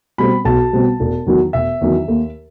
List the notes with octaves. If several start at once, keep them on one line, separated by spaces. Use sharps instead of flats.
B2 G3 C4 B5
B1 A5
B2 G3 C4
E1
E2 D#3 F#3
E1 E5
E2 D#3 F#3
D#2